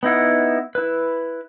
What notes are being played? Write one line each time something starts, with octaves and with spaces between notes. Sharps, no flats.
B3 D#4 E4 F#5
E4 B4